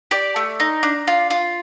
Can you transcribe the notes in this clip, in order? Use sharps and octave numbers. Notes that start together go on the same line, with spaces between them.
G4 D5
A3
D#4
D4
F4
F4